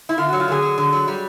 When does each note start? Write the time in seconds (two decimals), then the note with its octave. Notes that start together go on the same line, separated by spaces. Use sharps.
0.09 E4
0.18 D3 F4
0.29 F#4
0.33 F#3
0.40 F4
0.48 D3 G#4
0.62 F#3
0.78 D3
0.93 F#3
1.08 G3